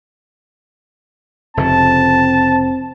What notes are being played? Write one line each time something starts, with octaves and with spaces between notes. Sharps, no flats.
F1 C#3 C4 A5